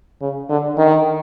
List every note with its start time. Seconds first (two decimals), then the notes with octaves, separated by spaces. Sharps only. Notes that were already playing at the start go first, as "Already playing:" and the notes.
0.21 C#3
0.49 D3
0.77 D#3